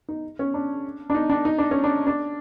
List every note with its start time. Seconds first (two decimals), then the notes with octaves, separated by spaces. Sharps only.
0.08 D#4
0.39 C#4
0.54 D4
1.10 D4
1.14 D#4
1.30 D4
1.45 D#4
1.58 D4
1.71 C#4
1.84 D4
2.07 D4